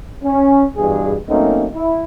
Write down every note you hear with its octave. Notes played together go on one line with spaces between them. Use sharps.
C#4
E2 G2 B2 G#4
F#3 A3 A#3 C4 C#4 D#4
E4